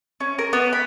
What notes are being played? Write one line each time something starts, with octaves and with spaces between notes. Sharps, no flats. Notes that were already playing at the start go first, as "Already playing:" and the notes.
C#4
A#4
B3
B5